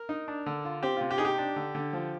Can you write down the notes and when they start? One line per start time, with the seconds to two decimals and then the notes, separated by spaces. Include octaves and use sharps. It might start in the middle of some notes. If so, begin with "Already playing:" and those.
Already playing: A#4
0.09 D#4
0.28 D4
0.46 D3
0.65 F4
0.83 C4 G4
0.97 C3 F4
1.11 G4
1.18 D#4 G#4
1.25 G4
1.38 D4
1.56 D3
1.75 D3
1.93 F3